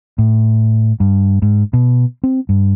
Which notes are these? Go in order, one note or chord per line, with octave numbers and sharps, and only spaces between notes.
A2
G2
G#2
B2
C4
G2